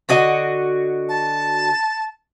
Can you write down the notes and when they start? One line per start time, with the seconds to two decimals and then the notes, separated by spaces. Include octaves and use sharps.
0.09 D3 F#4 D#5
1.09 A5